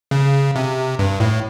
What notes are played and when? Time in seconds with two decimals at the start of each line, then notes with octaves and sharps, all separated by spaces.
0.11 C#3
0.56 C3
0.99 G2
1.20 A2